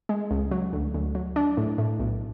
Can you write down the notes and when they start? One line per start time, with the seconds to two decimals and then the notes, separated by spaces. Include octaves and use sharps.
0.09 G#3
0.31 C#2
0.51 F#3
0.73 D2
0.94 D2
1.15 F#3
1.36 D4
1.57 A2
1.78 A2
1.99 B1